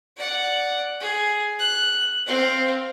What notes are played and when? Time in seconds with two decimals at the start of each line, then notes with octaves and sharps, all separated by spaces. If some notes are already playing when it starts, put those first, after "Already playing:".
0.17 D5 F#5
1.00 G#4
1.59 F#6
2.26 C4 F5